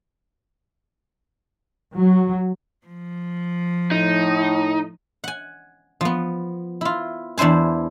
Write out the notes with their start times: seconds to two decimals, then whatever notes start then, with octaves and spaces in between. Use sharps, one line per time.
1.95 F#3
2.86 F3
3.91 A2 D#4
5.24 F#5 G#5
6.01 F3 B3
6.81 E4 F4
7.38 E2 D4 E4 C5 G#5